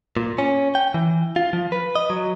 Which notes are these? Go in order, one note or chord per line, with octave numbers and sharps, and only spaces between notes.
A#2
C#4
G5
E3
F4
F3
B4
D#5
F#3